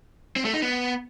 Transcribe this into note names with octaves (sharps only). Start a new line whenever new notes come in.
C4
A3
D#4
B3